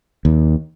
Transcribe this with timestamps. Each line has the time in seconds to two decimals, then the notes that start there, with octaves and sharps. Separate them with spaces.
0.25 D#2